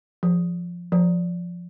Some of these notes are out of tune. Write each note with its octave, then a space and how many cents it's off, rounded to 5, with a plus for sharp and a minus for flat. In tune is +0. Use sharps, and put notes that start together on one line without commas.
F3 +0
F3 +5